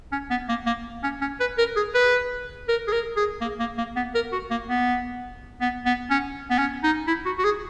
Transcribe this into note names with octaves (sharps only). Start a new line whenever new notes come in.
C#4
B3
A#3
A#3
C#4
C#4
B4
A#4
G#4
B4
A#4
G#4
A#4
G#4
A#3
A#3
A#3
B3
A#4
F#4
A#3
B3
B3
B3
C#4
B3
C#4
D#4
E4
F#4
F#4
G#4